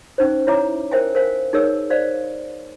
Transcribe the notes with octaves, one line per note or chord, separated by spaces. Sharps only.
C#4 D#4 C5
E4 C#5 E5 A#5 D6
A#4 C5 E5 G5 G#5
A#4 C5 F5 G#5
D#4 G#4 A#4 C#5 E6
C5 D5 F5